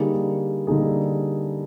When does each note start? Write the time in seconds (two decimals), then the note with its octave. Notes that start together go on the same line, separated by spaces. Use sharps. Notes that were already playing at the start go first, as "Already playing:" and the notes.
Already playing: D3 G3 A#3 D#4 G#4
0.67 D3 G3 A#3 D#4 G#4